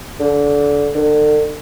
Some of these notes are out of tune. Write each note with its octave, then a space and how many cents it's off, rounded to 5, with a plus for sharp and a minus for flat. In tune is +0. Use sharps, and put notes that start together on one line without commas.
D3 -25
D3 +35